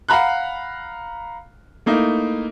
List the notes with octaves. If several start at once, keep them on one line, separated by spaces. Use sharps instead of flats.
F5 F#5 A#5 B5 F#6
A3 A#3 D#4 E4